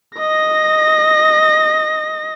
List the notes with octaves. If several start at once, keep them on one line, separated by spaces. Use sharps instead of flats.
D#5 A#6